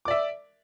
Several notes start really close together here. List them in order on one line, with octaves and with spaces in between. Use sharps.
D6 D5 E5